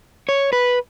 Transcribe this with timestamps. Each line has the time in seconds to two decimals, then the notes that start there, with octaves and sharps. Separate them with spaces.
0.29 C#5
0.53 B4